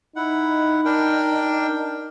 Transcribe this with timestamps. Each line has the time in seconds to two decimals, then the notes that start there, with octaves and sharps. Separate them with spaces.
0.16 D#4 E4 F#5
0.85 D4 A#4 G5